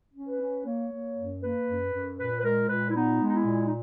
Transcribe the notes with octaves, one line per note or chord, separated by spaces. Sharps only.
C#4
B4
C#4
A#3 C#5
A#3
F#2
A#3 B4
F#2
F#2
A#2 B4
B4
G#3 A#4
A#2 B4
E4
B3 D#4
G#3
D#4
E4
A#2
D#4